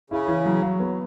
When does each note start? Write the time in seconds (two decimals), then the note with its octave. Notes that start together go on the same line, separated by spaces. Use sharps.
0.10 C#3 E4
0.28 E3
0.45 F#3
0.62 F#3
0.80 B3